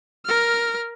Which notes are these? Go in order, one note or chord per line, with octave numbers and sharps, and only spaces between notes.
A#4 F6